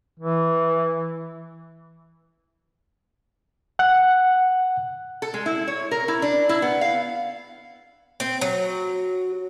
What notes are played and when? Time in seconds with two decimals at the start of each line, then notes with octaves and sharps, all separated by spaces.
0.19 E3
3.79 F#5 F#6
5.22 A4
5.34 G#3
5.46 E4
5.68 C#5
5.91 A#4
6.08 E4
6.22 D4
6.49 E4
6.62 B3
6.81 F5
8.20 C4
8.41 F#3